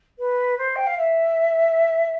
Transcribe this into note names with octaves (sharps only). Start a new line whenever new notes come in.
B4
C5
G5
F5
E5